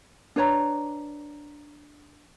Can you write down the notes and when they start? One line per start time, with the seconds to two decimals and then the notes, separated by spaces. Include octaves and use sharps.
0.36 D4 B4 C#5 A#5